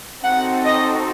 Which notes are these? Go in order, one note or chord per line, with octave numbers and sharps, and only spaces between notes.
C4 D#4 F#4 A4 F#5
D#5